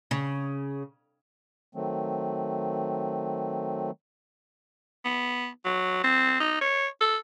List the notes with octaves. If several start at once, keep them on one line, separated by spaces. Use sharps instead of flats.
C#3
D#3 F#3 A3 C4
B3
F#3
C4
D#4
C#5
A4